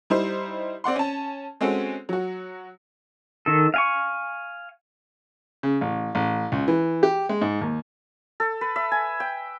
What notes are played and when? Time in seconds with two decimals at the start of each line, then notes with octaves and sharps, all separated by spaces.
0.10 G3 D#4 E4 C5
0.84 C4 D5 F#5 C6
0.96 C#4 A5
1.61 G#3 C4 C#4 F#4 A4
2.09 F#3 F#4
3.46 D#3 A4
3.74 F5 G#5 C#6
5.63 C#3
5.81 A1
6.15 A1
6.52 C#2
6.68 E3
7.03 G4
7.29 G#3
7.42 G#2
7.61 D#2
8.40 A4
8.61 B4
8.76 E5
8.92 G#5
9.20 G5